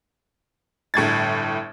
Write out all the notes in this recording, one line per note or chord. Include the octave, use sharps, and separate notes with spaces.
G1 A2 G#6 A6